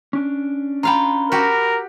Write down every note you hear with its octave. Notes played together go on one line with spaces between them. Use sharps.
C#4 D4
F4 F5 G5 A#5 B5
F#4 G4 A#4